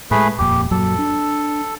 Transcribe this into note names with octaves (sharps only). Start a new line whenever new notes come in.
A2 G#3 A3 G#4 B4
D#1 F2 A#2 G4
F#2 A#2 F#3 A4
D4